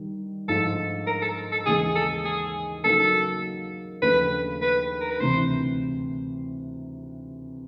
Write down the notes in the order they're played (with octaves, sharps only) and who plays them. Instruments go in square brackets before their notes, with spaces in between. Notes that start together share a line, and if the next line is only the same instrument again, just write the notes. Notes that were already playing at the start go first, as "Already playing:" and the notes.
Already playing: [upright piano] D#3 G3
[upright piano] G#2 F3 A3 D4 [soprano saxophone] A4
[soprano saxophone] A#4
A4
A4
[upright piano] D#2 C#3 E3 G#3 [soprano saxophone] G#4
[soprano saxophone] A4
G#4
[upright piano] C#3 F#3 A#3 D#4 [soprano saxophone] A4
[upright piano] D#2 C#3 F3 A3 D4 [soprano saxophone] B4
[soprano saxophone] B4
A#4
B4
[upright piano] D2 C3 E3 [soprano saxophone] C5